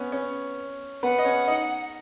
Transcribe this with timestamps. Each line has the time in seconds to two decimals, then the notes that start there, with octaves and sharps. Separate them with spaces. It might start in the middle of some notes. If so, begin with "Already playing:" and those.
Already playing: B3 C#4
0.12 C#4
1.03 B3 B4 F#5
1.19 D#5
1.25 C#4 C#5
1.48 D#4 D#5